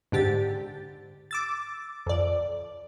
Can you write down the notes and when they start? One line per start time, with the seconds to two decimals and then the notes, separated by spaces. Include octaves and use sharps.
0.12 G#2 D3 G4 A6
1.31 D6 E6 A6
2.07 F2 D5